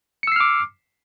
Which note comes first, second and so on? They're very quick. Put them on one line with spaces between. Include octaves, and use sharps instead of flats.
C#7 E6 C7 F6 D6